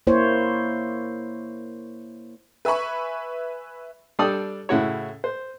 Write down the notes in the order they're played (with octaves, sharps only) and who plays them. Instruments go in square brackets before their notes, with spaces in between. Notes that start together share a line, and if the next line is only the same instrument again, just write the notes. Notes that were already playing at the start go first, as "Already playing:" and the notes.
[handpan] A#3 E4 C5 C#5
[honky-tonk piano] B4 E5 G#5 B5 C#6
[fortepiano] G3 D4 A4 D5 G5 D#6
A2 C#3 E4 F#4 C#5
C5